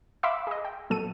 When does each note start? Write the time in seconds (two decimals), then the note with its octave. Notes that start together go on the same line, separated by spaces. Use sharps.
0.23 E5 F5 B5 C6 D6 E6
0.47 G#4 D#5
0.64 G5
0.90 A#2 F#3 A4 D#7